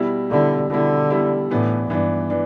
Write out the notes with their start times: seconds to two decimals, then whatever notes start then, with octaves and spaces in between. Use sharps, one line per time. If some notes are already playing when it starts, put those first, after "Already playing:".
Already playing: B2 G3 E4
0.31 B2 D3 G3 E4
0.70 B2 D3 G3 E4
1.10 B2 G3 E4
1.50 A2 E3 B3 D4
1.90 G2 E3 B3 D4
2.30 E3 D4